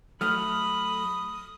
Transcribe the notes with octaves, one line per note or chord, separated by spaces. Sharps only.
F#3 A3 B5 D#6 F6